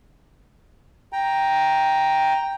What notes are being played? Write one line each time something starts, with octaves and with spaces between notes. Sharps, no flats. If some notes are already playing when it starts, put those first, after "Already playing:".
G5 A#5